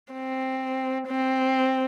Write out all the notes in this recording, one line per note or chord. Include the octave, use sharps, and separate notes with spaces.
C4
C4